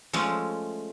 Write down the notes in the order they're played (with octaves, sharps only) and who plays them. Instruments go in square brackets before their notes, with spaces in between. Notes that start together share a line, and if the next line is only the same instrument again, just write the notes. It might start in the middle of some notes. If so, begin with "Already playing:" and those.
[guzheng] F3 G#3 A3 C#4